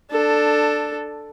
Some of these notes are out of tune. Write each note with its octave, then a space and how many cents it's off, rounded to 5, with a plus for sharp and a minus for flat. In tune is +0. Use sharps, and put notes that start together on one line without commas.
D4 +15 A4 +5